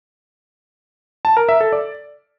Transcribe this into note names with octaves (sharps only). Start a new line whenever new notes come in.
A5
A#4
E5
A4
D5